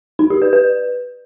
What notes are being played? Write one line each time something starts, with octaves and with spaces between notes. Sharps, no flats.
D#4
G4
B4
B4